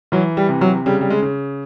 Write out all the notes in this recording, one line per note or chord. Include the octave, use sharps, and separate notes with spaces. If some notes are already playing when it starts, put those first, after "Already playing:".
E3 F#3
G3
C3
F#3
C#3 G3
G3
G#3
C#3